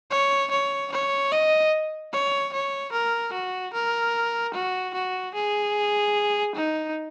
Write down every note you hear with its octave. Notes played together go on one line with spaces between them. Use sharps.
C#5
C#5
C#5
D#5
C#5
C#5
A#4
F#4
A#4
F#4
F#4
G#4
D#4